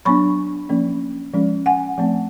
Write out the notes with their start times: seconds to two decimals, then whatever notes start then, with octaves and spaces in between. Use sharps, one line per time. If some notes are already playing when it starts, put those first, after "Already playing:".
0.05 F#3 B3 D4 B5 C#6
0.69 F3 A#3 C#4
1.34 F3 G#3 C#4
1.66 F#5 G#5
1.98 F3 A3 C4